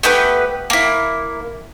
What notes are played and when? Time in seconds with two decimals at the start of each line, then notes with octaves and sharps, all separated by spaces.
0.03 A3 B3 G4 B4
0.70 A#3 E4